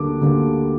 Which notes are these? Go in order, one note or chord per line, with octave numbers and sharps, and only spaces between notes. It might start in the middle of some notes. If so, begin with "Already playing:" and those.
Already playing: D2 D3 G3 A#3 D4 D6
D2 D3 G3 A#3 D4